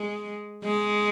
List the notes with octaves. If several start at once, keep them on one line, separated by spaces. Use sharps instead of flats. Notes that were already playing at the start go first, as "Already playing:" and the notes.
Already playing: G#3
G#3